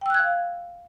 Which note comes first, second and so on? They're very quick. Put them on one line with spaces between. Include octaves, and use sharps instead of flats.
G5 E6 F#6 G#6 F5